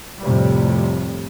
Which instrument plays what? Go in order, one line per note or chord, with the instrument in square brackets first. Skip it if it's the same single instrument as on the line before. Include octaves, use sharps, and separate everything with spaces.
[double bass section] F2 A2 C3 G3